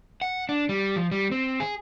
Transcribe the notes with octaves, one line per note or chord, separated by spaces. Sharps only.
F#5
D4
G3
F3
G3
C4
G#4